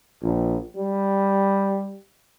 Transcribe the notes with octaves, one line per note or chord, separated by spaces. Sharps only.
A#1
G3